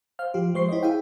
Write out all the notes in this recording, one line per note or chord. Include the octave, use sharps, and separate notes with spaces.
C5 F5 F6
F3 F4 G4
F3 G#3 C5 C#6 C7
E4 G4 C5 C#5 D#5
E4 G#4 E5 F5 G5